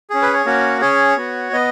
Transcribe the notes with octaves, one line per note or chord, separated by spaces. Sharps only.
C#4 G#4
B4
C#5
A#3 C#4 F#4
C#4 G#4 C#5
B3 F#4
B3 D#5